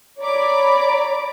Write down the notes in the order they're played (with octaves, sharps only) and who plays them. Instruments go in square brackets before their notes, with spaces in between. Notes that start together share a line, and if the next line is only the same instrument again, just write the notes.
[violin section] C#5 D5 A#5 B5 D6